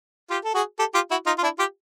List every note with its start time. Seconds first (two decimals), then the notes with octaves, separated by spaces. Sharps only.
0.30 F4 G4
0.45 A4
0.55 F#4 G#4
0.79 G4 A4
0.94 F4 G4
1.11 E4 F#4
1.26 D#4 F4
1.38 F4
1.43 D4 E4
1.58 F4 G4